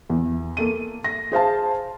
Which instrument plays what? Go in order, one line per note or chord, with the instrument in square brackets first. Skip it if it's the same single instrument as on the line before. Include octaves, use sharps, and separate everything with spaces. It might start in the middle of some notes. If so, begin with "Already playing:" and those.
[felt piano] E2
A#3 A4 D#7
A#6
G#4 C5 F5 A5